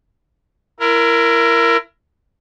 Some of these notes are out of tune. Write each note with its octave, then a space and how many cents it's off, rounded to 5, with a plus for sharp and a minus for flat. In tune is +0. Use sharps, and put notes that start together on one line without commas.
E4 +30 A#4 +0